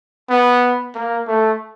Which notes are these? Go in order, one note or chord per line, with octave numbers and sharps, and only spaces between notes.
B3
A#3
A3